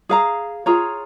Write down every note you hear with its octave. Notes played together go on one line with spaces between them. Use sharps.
G#4 F5 A#5
F4 G#4 C#5 A#5